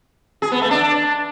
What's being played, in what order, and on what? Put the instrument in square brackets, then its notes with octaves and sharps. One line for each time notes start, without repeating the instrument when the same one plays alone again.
[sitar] G#4
B3
A3
D4